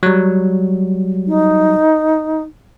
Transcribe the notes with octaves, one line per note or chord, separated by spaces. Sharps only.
F#3 G3
D#4